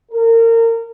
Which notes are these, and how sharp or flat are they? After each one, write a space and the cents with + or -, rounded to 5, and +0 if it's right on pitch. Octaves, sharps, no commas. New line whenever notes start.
A#4 -30